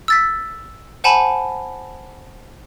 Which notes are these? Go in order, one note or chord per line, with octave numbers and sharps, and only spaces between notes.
E6 A6 B6
C5 F#5 G#5 A5 B5